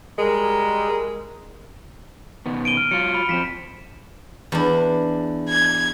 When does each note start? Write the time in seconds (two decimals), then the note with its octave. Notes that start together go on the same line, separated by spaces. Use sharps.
0.19 G3 G#3 A#4
2.46 B2 D#3 B3
2.65 D7 D#7 G7
2.77 F6
2.91 F#3 F4 C#7
3.15 B5
3.29 F2 C4 B6 E7
4.52 E2 D4
5.49 G#6